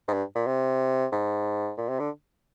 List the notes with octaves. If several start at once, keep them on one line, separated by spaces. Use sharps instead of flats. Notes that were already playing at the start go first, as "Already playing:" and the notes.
G#2
G2
A#2
C3
G#2
A#2
C3
D3